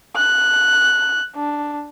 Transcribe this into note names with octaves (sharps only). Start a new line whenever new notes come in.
F#6
D4